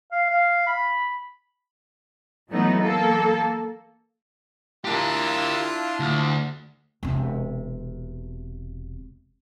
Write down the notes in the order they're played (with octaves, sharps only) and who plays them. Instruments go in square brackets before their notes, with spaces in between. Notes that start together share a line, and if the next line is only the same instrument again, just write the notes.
[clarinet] F5
F5
B5
[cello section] E3 F#3 A3 B3 D#4
A#3 A4
[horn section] D4 E4 F4 [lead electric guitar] G4 A#4
[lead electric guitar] D2
[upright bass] E1 C3